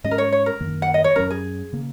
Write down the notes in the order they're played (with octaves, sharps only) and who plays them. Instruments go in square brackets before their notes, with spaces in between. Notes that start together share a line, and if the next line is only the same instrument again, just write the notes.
[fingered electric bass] G#2 G#3 C#4 [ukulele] D#5
[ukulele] A#4
C#5
C#5
A#4
[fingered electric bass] F#2 D#3 A#3
[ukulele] F#5
D#5
C#5
[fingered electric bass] F#2 F#3 C#4 [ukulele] A#4
[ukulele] G#4
[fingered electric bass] C#3 A#3